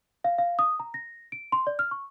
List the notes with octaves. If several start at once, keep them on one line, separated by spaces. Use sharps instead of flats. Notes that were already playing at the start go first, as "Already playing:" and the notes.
F5
F5
D#6
A#5
A#6
D7
C6
D5
F6
C#6